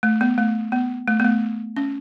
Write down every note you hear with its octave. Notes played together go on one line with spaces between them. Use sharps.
A3
B3
A3
B3
A3
B3
A3
C#4